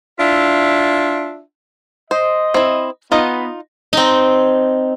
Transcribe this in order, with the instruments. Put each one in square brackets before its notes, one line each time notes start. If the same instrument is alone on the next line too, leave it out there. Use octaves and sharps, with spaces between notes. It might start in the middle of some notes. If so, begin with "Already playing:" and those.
[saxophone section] D4 E4 F4 E5
[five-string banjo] C5 [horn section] D#5
[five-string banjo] C4 E4
[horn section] B3 [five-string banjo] D#4 F4 D#5
[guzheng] C4 D#4